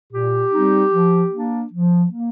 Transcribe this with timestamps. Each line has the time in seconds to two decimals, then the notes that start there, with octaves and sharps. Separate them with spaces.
0.12 A#2 G4
0.52 G3 C4 D#4
0.92 F3
1.32 A#3 D4
1.73 F3
2.12 A#3